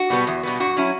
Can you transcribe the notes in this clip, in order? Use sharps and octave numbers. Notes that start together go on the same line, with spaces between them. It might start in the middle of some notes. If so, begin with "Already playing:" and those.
Already playing: F#4
B2 G3 B3
E2
B2 G3 B3
G2 F#4
F#3 C#4 E4